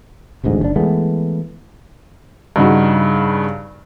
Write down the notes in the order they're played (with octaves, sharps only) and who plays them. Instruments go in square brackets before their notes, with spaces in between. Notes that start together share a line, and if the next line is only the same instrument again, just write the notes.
[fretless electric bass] E1 A1 D2 G#2
F#1 D4
E3 G#3 A3 B3
[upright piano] G2 C#3 D#4 F#4